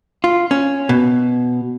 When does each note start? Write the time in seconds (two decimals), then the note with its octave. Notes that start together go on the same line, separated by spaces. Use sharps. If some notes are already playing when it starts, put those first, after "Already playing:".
0.24 F4
0.51 C#4
0.89 B2